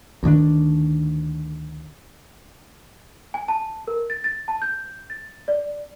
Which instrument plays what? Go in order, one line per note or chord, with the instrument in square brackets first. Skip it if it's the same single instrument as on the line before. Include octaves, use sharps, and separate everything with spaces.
[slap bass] D2 D#3 D4
[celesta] G#5
A5
A#4
A6
A6
A5
G6
A6
D5